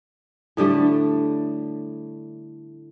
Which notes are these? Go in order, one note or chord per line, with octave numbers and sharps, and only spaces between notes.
A2 D3 G3 A3